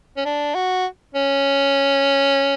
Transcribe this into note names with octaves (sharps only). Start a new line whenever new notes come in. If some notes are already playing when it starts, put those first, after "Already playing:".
C#4
D4
F#4
C#4